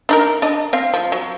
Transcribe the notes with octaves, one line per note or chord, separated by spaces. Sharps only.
D4 D#4 A#4
D4 D#5
C4 F5
F3
F#3